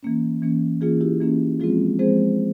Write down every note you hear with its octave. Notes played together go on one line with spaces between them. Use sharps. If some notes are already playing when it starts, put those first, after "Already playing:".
E3 A#3 C#4
E3 A#3 C#4
E3 A#3 C#4 F4 G#4
E4 G4
E3 A#3 C#4
F3 G#3 C4 F4 G#4
F3 G#3 C4 G#4 C5